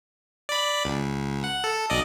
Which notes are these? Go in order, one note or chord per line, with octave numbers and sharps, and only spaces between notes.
D5 B5
C#2
F#5
A4
B1 D5 D#5